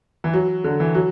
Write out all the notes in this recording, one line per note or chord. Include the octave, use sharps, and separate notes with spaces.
E3
F#3
D3
E3
F#3